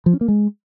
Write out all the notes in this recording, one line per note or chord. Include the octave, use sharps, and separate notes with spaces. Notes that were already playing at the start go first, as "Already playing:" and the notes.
F3
C#4
A#3
G#3